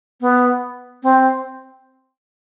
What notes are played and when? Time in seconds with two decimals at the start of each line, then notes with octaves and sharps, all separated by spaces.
0.21 B3
1.03 C4